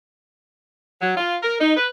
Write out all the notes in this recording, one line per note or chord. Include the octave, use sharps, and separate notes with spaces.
F#3
F4
A#4
D#4
B4